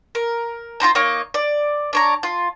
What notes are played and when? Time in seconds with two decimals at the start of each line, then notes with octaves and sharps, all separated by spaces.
0.15 A#4
0.80 F4 G4 C5 A#5
0.95 A#3 D#4 C#5 D#5
1.34 D5
1.93 D4 C#5 A#5
2.23 F4